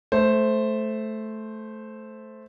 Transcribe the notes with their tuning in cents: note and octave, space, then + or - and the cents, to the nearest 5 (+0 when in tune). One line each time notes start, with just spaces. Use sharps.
A3 -10 C5 +0